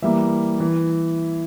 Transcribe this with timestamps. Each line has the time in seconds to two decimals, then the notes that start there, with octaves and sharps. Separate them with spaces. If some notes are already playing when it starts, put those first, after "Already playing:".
0.02 E3 G3 A#3 E5
0.60 E3